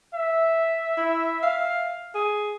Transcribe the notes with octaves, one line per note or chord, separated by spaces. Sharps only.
E5
E4
F5
G#4